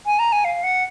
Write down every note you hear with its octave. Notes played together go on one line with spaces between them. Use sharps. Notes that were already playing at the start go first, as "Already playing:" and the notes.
G#5
A#5
G#5
F5
F#5